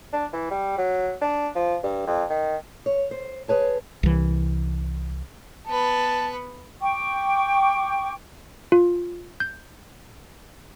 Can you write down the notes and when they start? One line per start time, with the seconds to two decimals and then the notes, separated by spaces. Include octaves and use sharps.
0.13 D4
0.33 E3
0.51 G3
0.78 F#3
1.21 D4
1.55 F3
1.83 G2
2.07 F2
2.30 D#3
2.86 C#5
3.11 C5
3.48 G#4 B4 C#5 A5
4.03 C2 E3
5.67 B3 B4 A5
6.82 G5 C#6 D6
8.72 F4
9.40 G6